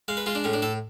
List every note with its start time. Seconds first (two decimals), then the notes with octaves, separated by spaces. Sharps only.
0.08 G#3 F5
0.17 B4
0.26 G#3 F4
0.35 D4
0.44 A2 C#4
0.53 D4
0.62 A2 A4